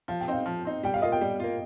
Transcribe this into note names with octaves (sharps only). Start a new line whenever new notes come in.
F3 F5
G5
C4 D#4 F5
F3
C4 D#4
G3 G5
F5
A#3 F4 D#5
G5
G3
A#3 F4